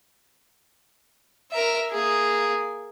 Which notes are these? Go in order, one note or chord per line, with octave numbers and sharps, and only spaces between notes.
A#4 E5
A#3 G#4